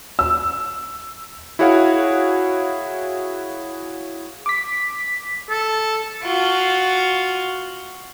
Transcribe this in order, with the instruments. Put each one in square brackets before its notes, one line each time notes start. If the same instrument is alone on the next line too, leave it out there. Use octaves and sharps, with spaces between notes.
[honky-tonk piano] E6
[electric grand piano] E4 F#4 G#4 C#5 F5 F#5
[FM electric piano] D6 B6
[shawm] A4
[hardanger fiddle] F4 F#4